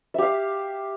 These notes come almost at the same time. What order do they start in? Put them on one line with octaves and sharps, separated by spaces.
E5 G4 F5